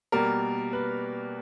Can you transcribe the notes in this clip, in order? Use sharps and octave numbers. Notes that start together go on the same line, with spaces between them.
B2 G3 A#3 A#4
B4